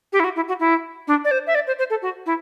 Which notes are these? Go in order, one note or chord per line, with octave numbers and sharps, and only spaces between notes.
G4
E4
F#4
E4
F#4
E4
D4
D5
C5
E5
D5
C5
C5
A4
F#4
E4